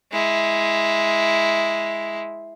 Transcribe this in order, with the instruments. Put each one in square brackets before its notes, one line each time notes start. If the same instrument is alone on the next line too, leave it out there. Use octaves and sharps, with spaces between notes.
[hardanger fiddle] G#3 E4